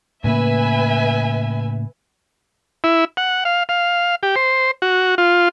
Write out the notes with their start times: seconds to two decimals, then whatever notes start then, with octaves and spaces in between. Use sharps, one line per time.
0.24 A2 C#3 A#3 B4 E5 G#5
2.84 E4
3.17 F#5
3.45 F5
3.69 F5
4.23 G4
4.36 C5
4.82 F#4
5.18 F4